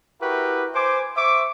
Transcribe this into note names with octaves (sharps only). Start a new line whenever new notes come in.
E4 F#4 G4 A#4 B4
C5 G#5 D6
C5 E5 C#6 D6